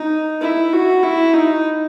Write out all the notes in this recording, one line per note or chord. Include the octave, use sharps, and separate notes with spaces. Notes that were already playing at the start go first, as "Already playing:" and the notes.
Already playing: D#4
E4
F#4
E4
D#4